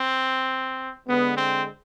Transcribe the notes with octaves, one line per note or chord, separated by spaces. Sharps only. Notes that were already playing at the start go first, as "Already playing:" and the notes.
Already playing: C4
D3 G#3 B3
C4